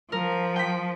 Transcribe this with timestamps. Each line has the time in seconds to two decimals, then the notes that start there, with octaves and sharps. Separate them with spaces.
0.12 F3 A#4
0.56 G5 B6